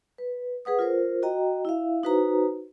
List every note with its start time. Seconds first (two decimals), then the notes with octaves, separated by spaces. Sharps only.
0.18 B4
0.65 G#4 B4 F#5 D#6
0.79 F4 A#4 C5
1.23 F#4 D#5 G5 A#5
1.65 E4 E5 F5
2.03 D#4 F#4 B4 C5 A#5